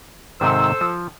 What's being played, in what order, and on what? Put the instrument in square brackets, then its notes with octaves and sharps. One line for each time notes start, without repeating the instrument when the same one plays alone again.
[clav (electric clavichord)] G#2 C3 D#3 [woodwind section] A4 C5 E6
[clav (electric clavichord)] F3